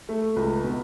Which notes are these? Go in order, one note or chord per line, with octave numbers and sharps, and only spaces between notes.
A3
C#2
B2